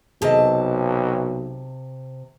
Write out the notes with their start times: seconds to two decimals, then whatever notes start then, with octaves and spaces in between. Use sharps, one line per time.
0.22 B1 C3 G#4 A#4 D#5 A5